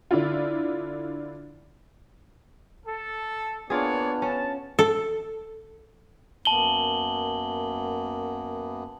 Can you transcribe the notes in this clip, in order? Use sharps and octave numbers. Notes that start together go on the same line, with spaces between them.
D3 D4 E4 F4
A4
A#3 B3 D4 F4 G#4 C#5 D5
C#4 A5
A4
F#2 A#3 B3 A5 F#7 G7